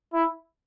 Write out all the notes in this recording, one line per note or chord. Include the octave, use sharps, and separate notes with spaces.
E4